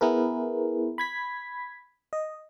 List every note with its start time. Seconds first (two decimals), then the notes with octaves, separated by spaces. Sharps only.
0.01 B3 E4 G#4 A#4 B4
0.98 B5 G#6 B6
2.13 D#5